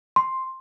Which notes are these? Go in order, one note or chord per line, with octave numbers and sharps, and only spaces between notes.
C6